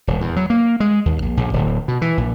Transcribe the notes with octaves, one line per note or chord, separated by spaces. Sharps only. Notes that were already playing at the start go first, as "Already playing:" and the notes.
D#1
E2
F#3
A#3
G#3
D#2
A#1
A#1
D1
B2
E3
A#1